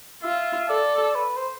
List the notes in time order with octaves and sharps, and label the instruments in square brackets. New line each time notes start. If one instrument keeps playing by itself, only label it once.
[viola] F4 [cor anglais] E5
[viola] A4 [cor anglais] D5
[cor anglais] B4
C5